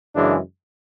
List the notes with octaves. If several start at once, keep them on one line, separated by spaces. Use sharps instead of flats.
F#2 C#3 E3 G#3 D4